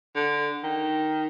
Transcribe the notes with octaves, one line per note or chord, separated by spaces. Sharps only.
D3
D#3